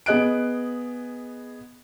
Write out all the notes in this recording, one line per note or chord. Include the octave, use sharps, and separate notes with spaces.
B3 G#4 D#5 F#6 D7